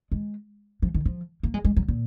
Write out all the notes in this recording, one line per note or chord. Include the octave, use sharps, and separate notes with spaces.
G#3
F3
D#3
F3
A#3
G#3
G#3
F#3
A#2